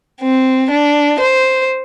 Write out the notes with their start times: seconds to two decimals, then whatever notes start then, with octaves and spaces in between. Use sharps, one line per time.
0.21 C4
0.71 D4
1.20 C5